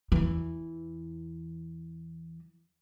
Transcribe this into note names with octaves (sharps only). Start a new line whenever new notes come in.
E2 E3